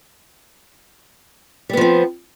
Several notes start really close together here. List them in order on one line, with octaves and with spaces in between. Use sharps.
G3 B3 F3 C4